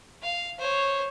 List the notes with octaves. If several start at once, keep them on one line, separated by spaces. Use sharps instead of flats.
F5
C5 C#5